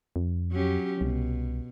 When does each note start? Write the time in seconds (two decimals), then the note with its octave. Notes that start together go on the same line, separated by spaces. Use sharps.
0.16 F2
0.52 F#3 C#4 G4
1.01 C2 B2